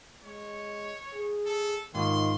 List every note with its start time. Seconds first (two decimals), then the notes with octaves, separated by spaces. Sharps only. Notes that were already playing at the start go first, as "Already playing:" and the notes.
0.24 G#3 C#5
1.13 G#4
1.46 A4
1.95 G#2 D#3 F4 C6